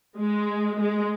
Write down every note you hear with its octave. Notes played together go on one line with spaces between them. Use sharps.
G#3
G#3